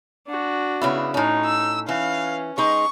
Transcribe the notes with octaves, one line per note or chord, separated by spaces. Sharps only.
D4 F#4
C#3 B3 E4
A2 C#4 D#4
E6
E3 C#4 F5
G#3 D#4 C#6